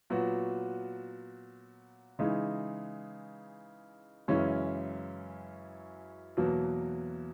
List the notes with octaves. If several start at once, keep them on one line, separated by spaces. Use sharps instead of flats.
A#2 F#3 B3 F#4
C#3 E3 G#3 D#4
F#2 C#3 E3 G#3 C#4
E2 B2 F#3 A#3